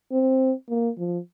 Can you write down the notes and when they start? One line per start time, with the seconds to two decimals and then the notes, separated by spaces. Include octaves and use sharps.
0.12 C4
0.69 A#3
0.98 F3